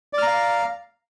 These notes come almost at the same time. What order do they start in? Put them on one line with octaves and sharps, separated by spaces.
D5 F6 A#5 F5